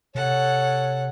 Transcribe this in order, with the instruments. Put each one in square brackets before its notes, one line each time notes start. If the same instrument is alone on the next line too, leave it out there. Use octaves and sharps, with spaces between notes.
[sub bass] C3 [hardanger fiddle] A4 F#5 [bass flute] C#5